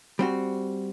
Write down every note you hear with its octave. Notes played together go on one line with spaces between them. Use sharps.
G3 C4 F#4